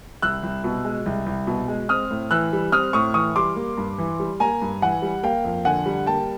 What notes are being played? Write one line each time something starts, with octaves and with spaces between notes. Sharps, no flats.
C2 E6 F#6
C2
B2
G#3
C2
C2
B2
G#3
C4 D#6 F6
A2
E3 E6 F#6
G3
C4 D#6 F6
A2 C#6 D#6
E3 C#6 D#6
G3 C6 D6
A#3
G2
E3
G3
A#3 G#5 A#5
G2
E3 F#5 G#5
G3
A#3 F5 G5
F2
D3 F#5 G#5
G3
A#3 G5 A5